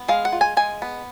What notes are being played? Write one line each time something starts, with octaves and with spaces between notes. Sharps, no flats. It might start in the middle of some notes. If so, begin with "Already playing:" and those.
Already playing: B3
G#3 F5
F#5
F4
G#5
G#3 G#5
B3